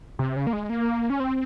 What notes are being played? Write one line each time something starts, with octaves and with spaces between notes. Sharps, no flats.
C3
C#3
A#3
G#3
A#3
C#4
C4